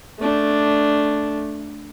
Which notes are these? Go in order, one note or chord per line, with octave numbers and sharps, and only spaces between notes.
A3 D4